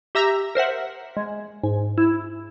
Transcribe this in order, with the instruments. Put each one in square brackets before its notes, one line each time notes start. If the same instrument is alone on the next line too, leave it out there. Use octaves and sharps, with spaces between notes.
[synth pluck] G4 E5 A#5 E6 A#6
A#4 C5 E5 F#5
G#3
G#2
E4